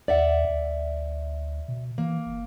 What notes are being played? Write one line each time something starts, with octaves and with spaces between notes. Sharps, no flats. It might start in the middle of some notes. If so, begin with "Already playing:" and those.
D#2 D5 E5 F#5
D2
B2
E3 A#3
F#1